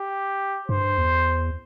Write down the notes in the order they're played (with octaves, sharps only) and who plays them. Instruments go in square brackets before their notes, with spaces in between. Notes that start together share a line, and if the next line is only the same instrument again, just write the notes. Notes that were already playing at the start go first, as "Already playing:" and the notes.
Already playing: [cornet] G4
[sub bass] G2 [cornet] C5
[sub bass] E2